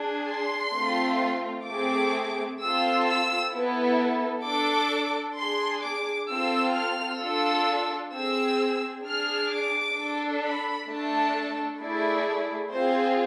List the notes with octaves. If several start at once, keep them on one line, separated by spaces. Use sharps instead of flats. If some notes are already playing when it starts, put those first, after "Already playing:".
Already playing: D4 G#4
C6
A3 C4 F4
A3 C4 G#4 D6
C4 F4 A4 E6
E6
B3 E4 A4
D4 A4 D6
D4 G#4 C6
D6
C4 F4 A4 E6
F6
D4 F4 A4 E6
C4 G#4 E6
D4 G#4 F6
D6
D4 A4
B5
A3 D4 A4 A5
A3 E4 G#4 D5
C4 F4 G#4 C5